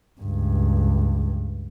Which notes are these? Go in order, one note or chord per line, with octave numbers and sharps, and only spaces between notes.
C#2 G2